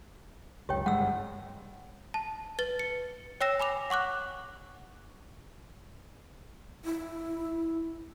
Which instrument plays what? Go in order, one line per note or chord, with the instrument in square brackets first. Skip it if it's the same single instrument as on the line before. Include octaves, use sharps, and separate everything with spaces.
[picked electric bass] C#2 F#2 [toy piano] G4 C#5 G5
[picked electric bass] G1 G3 G#3 [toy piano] F#5 E6
[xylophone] A5
B4 A6 G7
C#7
C#5 G5 E6 A#6 E7
G#5 B5 D6 F7
F#5 C#6 D6 F#6
[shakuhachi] E4